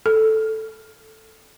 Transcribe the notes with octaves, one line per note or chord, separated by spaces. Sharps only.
A4